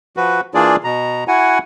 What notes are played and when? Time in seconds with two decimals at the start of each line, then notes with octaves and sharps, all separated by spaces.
0.17 F3 F#4 B4
0.54 E3 A#3 D4 F4 G#4 D5
0.84 B2 A#5
1.28 E4 F#4 F#5 G#5